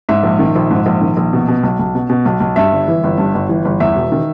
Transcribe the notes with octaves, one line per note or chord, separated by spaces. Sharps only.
G#2 E5
A#1
D#3
A#1
G#2
A#1
D#3
A#1
B2
B2
B1
B1
B2
B2
B1
B1
G2 E5
G1
E3
G1
G2
G1
E3
G1
E2 E5
E1
D#3